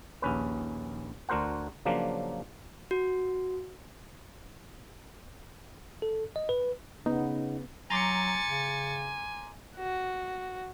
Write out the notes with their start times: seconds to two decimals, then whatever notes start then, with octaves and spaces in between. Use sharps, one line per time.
0.22 A#1 D#2 C#4 B4
1.29 D2 D4 F#4 A#4 C5 F#5
1.85 C#3 F3 F#3 A#3 D4
2.91 F#4
6.02 A4
6.36 D#5
6.49 B4
7.06 C#3 B3 D#4
7.90 F#3 G#5 A#5 C6 D6 A6 C#7
8.48 C#3
9.76 F#4